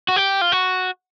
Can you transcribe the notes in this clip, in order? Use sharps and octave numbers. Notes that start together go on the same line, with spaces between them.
F#4
G4
F4
F#4